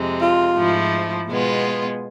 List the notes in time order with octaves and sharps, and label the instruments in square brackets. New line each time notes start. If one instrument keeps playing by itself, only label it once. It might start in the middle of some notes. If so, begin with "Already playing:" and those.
Already playing: [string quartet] F2 C3 G#3
[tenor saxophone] F4
[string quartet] G#2 F3 A3 E4
B2 G#3 B3 F4